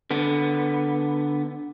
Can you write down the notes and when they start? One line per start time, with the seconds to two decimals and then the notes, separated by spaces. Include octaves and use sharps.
0.11 D3 B3